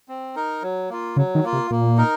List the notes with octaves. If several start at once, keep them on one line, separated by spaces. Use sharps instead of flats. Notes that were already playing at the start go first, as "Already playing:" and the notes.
C4
D#4 A#4
F#3
A#3 F4
C#3 F#3
D#3
A#3 F4
C3
A#2 A#3
D#4 A#4